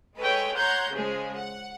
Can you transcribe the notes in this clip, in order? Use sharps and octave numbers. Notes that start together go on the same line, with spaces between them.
G#3 A4 B4 C#5 G5
C#5 F#5 A#5 C6 G6 G#6
C#3 F3 G#3 G#4
F#5